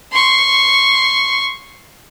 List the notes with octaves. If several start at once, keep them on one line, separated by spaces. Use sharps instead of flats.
C6 C#6